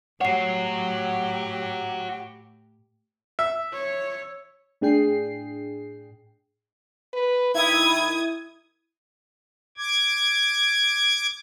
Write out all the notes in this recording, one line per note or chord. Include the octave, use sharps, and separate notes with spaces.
A2 F#4 G4 C#5 F#5 C7
E5
C#5
A2 D4 G#4 G5 C7
B4
D#3 E4 D#6 G#6
D6 G#6